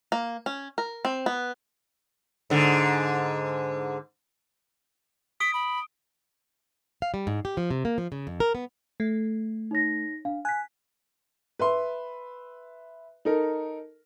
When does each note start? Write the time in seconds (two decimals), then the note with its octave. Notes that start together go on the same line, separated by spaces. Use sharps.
0.12 A#3
0.46 C#4
0.78 A#4
1.05 C4
1.26 B3
2.50 G#2 D3
5.40 D#6 B6 D7 G7
5.54 B5
7.02 F5
7.14 G3
7.27 G#2
7.45 G4
7.57 F3
7.71 C3
7.85 A#3
7.98 F3
8.12 C#3
8.27 F2
8.40 A#4
8.55 B3
9.00 A3
9.71 D#4 C#5 A#6
10.25 D4 F5
10.45 G#5 F#6 B6
11.59 B4 E5 C6
13.25 D#4 A4 A#4